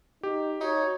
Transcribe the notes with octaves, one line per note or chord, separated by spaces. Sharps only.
D#4 G4
D#4 F#4 C#5